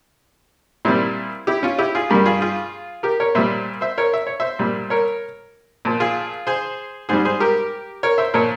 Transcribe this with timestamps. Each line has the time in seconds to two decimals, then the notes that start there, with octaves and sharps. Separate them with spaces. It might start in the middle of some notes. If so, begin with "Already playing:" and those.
0.85 A#2 G3 C4 E4
1.47 E4 G4
1.63 C#4 F4
1.78 E4 G4
1.95 F4 G#4
2.10 G2 G3 G4 A#4
2.26 F4 G#4
2.41 F4 G#4
3.03 G4 A#4
3.20 A#4 C#5
3.35 A#2 G3 C5 E5
3.81 C5 E5
3.98 A#4 C#5
4.14 E5
4.27 C#5
4.40 C5 E5
4.59 A#2 G3
4.90 A#4 C#5
5.85 A#2 F3
6.00 F4 G#4
6.47 G#4 C5
7.09 G#2 G3 G#4 C5
7.25 G#4 C5
7.40 G4 A#4
8.03 A#4 C#5
8.18 C5 E5
8.34 A#2 F3 A#4 C#5